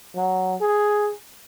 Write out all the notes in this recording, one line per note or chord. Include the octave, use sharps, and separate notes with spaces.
F#3
G#4